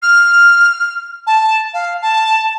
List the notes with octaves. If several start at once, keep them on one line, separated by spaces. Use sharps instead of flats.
F6
A5
F5
A5